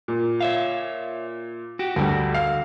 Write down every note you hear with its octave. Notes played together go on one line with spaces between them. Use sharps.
A#2
C#5 E5 F5
F#4 G4
D2 D3 G3 F#4
F5